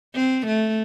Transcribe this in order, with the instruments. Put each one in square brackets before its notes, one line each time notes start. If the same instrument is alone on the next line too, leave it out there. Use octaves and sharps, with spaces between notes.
[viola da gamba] C4
A3